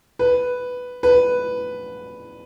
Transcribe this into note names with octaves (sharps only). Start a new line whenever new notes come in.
B4
B4